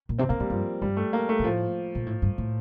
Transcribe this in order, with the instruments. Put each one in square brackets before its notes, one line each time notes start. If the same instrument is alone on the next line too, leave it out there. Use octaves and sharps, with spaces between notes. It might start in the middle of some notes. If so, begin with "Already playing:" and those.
[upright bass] A#2
[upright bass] C3 [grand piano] C4
[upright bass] A#2 [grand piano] A#3
[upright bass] A2 [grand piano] G3
[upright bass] G2 [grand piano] F3
[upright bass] G2 [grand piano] G3
[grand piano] A3
A#3
A3
[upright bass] A#2
[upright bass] A2 [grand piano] F3
[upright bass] A#2
A2
G2
A2